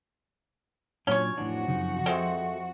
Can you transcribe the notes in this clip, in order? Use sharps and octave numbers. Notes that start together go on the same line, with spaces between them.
A#2 F#3 C#4 D4 C#5
F2 A2 E3 D4 F#4
F#2 C#3 D#4
G#3 C4 A4 E5